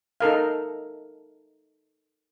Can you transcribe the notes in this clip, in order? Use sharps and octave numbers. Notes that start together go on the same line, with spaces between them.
D#4 A4 A#4 F5